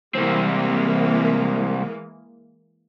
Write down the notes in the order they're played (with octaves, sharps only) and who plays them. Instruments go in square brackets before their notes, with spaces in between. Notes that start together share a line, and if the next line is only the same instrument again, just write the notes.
[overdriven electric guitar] C2 C4 [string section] E3 G#3 A#3